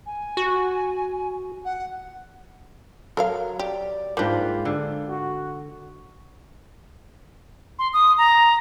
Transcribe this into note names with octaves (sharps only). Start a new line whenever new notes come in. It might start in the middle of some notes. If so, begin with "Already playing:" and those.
G#5
F#4
F#5
F#3 A4 A#4 F5
G4 D5
G#2 A#3 D4 F4 B4 G5
D3
F#4
C6
D#6
A#5